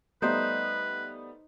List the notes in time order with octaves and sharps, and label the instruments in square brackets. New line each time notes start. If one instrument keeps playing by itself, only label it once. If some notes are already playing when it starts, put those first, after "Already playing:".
[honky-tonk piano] G3 A3 B3 [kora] D#4 C5 [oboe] B4